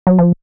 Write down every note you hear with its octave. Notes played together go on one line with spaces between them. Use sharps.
F#3
F3